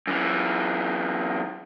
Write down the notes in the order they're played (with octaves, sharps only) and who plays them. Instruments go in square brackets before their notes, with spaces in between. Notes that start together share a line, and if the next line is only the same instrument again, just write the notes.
[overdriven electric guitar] F#2 E3